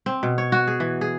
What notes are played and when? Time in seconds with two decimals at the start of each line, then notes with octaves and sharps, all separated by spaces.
0.06 C4
0.23 B2
0.38 C#5
0.52 F#4
0.68 G#4
0.80 E3
1.01 G#4